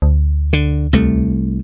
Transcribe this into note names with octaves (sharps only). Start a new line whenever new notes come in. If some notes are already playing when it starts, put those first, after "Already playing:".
D2
D3
C2 A3